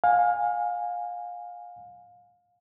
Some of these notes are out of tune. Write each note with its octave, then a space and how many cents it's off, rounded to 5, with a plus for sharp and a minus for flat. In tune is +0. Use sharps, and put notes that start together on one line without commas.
F5 +25 G#5 -15